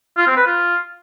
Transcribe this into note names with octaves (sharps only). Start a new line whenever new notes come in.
F4
C4
B4
F4